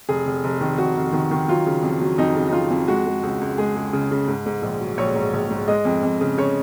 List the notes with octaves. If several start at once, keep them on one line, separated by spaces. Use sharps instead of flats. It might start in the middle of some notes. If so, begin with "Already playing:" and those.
F1 G#4
F1
F1
D#3
F1 F#4
F1
D#3
D#3
F#3 F4
C#3
F2
F#3
F2 D#4
C#3
D#4
F2 F4
F2
G#3 F#4
G#3
C#2
C#2
G#3 G#4
C#2
C#3
C#3
G#2
G#2
A#1
F#3
A#1 C#5
G#2
A#1
G#2
G#3 D#5
F2
F2
C#3
C#3 C#5